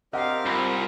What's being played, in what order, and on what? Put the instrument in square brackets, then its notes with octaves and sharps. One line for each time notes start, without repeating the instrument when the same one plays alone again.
[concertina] C4 G4 A#4 [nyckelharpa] D4 F5 [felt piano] D#5 F#5
[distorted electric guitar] C2 [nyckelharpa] F4 [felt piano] B5